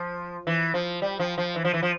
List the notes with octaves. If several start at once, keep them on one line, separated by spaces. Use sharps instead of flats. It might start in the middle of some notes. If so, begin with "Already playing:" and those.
Already playing: F3
E3
F3
G3
F3
F3
E3
F3
E3
F3